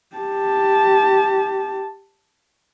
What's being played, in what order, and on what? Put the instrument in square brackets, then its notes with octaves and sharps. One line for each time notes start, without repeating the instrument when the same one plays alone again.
[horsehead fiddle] G4 A5